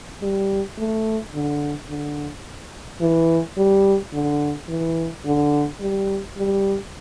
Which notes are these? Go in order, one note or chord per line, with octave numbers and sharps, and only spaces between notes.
G3
A3
D3
D3
E3
G3
D3
E3
D3
G3
G3